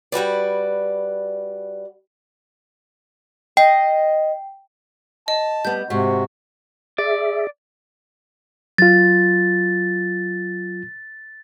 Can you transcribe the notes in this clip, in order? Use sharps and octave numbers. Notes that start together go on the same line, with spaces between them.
G3 F#4 B4 D5
D#5 G5
D#5 A5
G3 B3 G6
G#2 C3 F#4
G#4 D5 E5
F#3 F4 A6